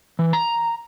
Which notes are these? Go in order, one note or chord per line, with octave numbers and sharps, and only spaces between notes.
E3
A#5